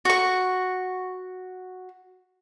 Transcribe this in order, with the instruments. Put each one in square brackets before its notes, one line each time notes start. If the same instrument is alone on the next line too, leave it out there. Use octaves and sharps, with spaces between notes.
[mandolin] F#4 C#6